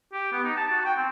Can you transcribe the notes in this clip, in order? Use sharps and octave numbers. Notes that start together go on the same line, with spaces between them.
G4
B3
D#4
A5
F#4
G5
C4